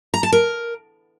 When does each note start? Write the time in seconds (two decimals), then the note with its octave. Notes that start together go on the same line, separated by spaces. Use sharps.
0.14 A#5
0.23 A5
0.32 A#4